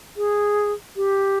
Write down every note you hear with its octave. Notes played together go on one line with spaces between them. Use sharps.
G#4
G4